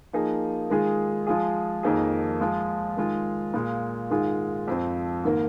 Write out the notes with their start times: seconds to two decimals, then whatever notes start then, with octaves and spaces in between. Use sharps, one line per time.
0.13 F3 A#3 D#4 G#4
0.70 D#3 G#3 F4 G#4
1.27 F3 G#3 F4 G#4
1.83 F2 D#3 A#3 D#4 G#4
2.40 F3 G#3 F4
2.97 D#3 G#3 F4
3.54 A#2 G#3 F4
4.10 G#2 D#3 G#3 F4 G#4
4.68 F2 F3 C4
5.24 G#2 D#3 A#3